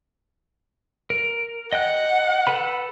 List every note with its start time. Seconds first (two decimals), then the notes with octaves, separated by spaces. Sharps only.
1.10 A#4
1.73 D#5 F#5 G5 F#6
2.47 A4 B4 B5